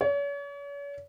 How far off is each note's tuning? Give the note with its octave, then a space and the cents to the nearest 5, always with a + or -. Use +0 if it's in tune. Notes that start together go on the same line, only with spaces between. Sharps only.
C#5 +40